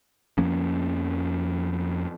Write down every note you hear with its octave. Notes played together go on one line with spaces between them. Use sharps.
F2 F3 A#3 C#4